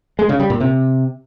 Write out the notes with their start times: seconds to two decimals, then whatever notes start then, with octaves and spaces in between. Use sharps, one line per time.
0.19 G#3
0.29 C#3
0.40 G3
0.50 A#2
0.60 C3